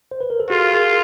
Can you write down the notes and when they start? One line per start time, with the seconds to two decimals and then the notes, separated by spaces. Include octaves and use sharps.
0.11 C5
0.21 B4
0.30 A#4
0.40 A4
0.50 F4 F#4 G#4
0.73 G#4 A#4